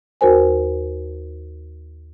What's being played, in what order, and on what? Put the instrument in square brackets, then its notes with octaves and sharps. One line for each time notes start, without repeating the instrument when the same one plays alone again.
[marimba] D#2 F#4 A#4 C5 G#5